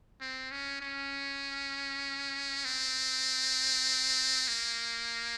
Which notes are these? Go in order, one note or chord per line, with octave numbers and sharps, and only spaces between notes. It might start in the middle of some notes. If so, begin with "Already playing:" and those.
C4
C#4
C#4
C4
A#3